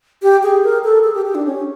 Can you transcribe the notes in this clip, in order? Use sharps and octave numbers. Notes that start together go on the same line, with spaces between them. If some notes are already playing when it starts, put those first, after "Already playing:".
G4
G#4
A#4
A4
G#4
G4
G4
D4
C#4